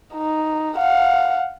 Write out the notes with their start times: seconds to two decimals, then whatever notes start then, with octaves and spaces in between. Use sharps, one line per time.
0.14 D#4
0.76 F5 F#5